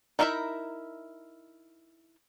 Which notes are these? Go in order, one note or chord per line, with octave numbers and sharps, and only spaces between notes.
D#4 E4 A#4 D#5 E5